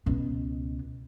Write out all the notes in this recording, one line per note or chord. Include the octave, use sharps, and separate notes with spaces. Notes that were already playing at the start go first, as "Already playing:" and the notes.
C#2 B2